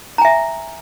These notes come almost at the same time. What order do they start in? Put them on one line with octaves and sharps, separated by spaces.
A#5 G#5 E5